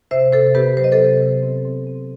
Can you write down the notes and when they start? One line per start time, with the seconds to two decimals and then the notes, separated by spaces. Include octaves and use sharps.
0.11 C3 C5 E5
0.32 C3 A4 C5
0.55 B3 G4 B4
0.77 F#3 C5
0.84 D#5
0.92 A4 C5
0.99 C3
1.22 C3
1.42 C4
1.65 C4
1.87 C4